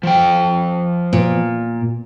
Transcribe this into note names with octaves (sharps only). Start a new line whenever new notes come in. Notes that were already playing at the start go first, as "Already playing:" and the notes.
F3 G5
A#2